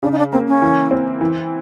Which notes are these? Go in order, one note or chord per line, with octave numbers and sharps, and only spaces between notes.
C#3 D4
D#4
D4
A#3 C4
C#4
E3
C4
E3